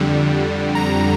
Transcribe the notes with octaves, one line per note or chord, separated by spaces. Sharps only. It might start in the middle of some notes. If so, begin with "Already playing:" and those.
Already playing: F2 D3 G3
A#5